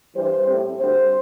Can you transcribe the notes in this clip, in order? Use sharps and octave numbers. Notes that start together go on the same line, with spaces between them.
G2 E3 G3 C5
A2 G3 C4
D2 D3 G3 C5